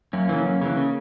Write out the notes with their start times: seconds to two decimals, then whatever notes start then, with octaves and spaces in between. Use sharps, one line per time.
0.13 F#2 A#3 C#4
0.29 C#3 E3
0.45 F#2
0.61 C#3 E3
0.77 C#3